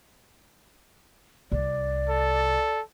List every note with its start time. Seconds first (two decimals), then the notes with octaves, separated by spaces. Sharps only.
1.52 C2 D5
2.09 A4